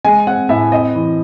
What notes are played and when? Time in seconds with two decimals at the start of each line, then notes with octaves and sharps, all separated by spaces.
0.05 G#3 G#5
0.27 C4 F#5
0.49 A2 E5
0.72 C4 D#5
0.95 E3